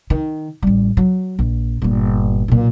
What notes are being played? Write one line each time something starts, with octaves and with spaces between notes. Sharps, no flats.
D#3
A1 G3
F#3
A#1
G1 A#2
B1 A#2